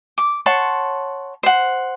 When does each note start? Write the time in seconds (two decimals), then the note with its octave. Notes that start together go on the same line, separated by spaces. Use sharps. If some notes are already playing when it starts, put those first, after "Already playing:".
0.18 D6
0.46 C#5 F#5 A5 C6
1.43 C5 F#5